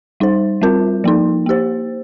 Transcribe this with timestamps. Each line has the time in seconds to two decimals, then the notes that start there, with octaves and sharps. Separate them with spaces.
0.20 G3 D#4 C5
0.61 G3 C4 F4 A#4
1.04 F3 A#3 D#4
1.46 A#3 G4 C5